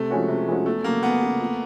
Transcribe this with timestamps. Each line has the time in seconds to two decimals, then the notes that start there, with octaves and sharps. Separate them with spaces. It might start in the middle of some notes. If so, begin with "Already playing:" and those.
Already playing: C3 A3
0.10 F3 G#3 C#4 F#4
0.28 C3
0.47 F3 G#3 C#4 F#4
0.66 E2 A3
0.84 C#3 F#3 A#3
1.03 E2 B3
1.21 C#3 F#3
1.40 F2